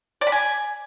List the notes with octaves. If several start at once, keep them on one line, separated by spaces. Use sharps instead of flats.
D5
B5
G#5